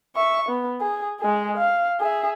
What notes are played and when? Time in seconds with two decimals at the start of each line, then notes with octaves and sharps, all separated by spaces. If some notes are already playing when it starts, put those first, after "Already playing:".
0.16 E5 C#6
0.49 B3
0.81 G#4
1.19 G#3 G#4
1.57 F5
2.01 G#4 E5